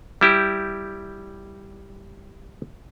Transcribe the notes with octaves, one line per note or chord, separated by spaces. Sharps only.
G3 E4 G4